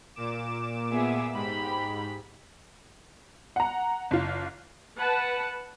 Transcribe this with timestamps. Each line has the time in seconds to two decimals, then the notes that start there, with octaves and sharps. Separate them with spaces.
0.15 A#2 D6 E7
0.90 B3 G#4 E5
1.33 G#2 G4 B5
3.56 F#5 A#5
4.11 F#1 F4
4.98 B4 F#5 A5